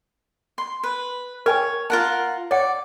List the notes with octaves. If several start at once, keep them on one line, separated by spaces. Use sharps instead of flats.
C6
B4
A#4 C#5 G5 G#5
F4 A#4 F#5 A5
C#5 D5 F#5